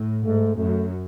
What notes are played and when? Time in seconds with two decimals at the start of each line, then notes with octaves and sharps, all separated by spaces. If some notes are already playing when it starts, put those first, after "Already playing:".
Already playing: A2
0.25 G#2 A3
0.57 F#2 A3